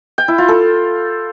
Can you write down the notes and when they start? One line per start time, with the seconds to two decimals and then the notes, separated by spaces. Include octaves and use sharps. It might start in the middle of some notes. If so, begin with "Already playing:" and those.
0.18 G5
0.28 E4
0.38 F4
0.48 A4